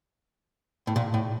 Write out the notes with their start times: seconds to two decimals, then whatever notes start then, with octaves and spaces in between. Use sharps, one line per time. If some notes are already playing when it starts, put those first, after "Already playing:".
0.87 A2
0.96 A#2
1.14 A2